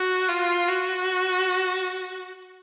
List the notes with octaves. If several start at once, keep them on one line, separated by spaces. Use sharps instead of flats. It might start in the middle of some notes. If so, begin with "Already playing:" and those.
Already playing: F#4
F4
F#4